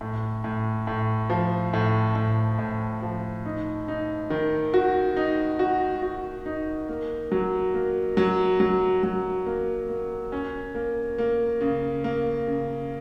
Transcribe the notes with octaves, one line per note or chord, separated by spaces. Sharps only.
A2
A2
A2
F3
A2
A2
A2
F3
D#4
D#4
D#3
F#4
D#4
F#4
F#4
D#4
A#3
F#3
A#3
F#3
F#3
F#3
A#3
A#3
C#4
A#3
A#3
C#3
A#3
C#3